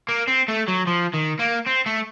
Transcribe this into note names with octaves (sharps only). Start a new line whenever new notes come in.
A#3
C4
A3
F#3
F3
D#3
A#3
C4
A3